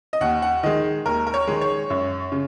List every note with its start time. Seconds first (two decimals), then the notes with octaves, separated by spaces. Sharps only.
0.13 D#5
0.21 D#2 F#5
0.42 F#5
0.63 D#3 G#3 D#5
1.06 D#2 A#4
1.27 A#4
1.34 C#5
1.47 D#3 G#3
1.61 C#5
1.90 F#2
2.32 C#3